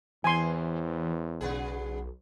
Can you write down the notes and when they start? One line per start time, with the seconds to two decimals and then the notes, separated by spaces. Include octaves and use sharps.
0.24 E2 E3 C4 G#5 C6
1.41 B1 C#3 B3 G#4